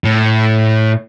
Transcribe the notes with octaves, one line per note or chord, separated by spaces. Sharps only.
A2